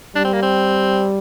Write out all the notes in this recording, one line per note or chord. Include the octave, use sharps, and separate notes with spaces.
G3 D4
C4
A#3
C4